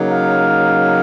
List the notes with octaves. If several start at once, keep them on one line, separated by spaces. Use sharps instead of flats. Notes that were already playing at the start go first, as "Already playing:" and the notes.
Already playing: C#3 F#3 A#3 D#4
F5